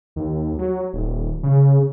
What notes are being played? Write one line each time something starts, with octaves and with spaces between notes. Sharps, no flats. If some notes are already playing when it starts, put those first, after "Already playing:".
D#2
F#3
D#1
C#3